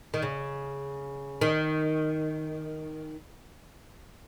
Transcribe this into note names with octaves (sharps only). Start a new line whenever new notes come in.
D#3
C#3
D#3